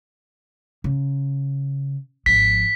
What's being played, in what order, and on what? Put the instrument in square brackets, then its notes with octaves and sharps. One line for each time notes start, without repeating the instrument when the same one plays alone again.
[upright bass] C#3
[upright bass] G#1 F3 [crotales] B6